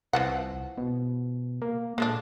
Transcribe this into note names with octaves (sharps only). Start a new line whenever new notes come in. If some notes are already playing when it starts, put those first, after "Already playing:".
C2 E3 F3 F#5
B2
A#3
A#2 G#3 A3 D4